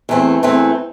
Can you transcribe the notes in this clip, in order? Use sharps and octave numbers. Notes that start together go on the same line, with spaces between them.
E2 E3 A3 C4
E2 E3 A3 C4